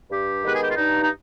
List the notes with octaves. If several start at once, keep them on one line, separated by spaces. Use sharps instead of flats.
G2 G4
D#3 G#3 B3 B4
G#4
G4
F4
G2 D#4
D#4